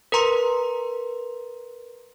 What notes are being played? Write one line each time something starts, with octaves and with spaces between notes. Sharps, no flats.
A#4 B4 A#5 C6